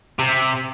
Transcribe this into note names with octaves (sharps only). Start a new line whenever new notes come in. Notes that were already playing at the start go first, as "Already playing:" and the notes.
C3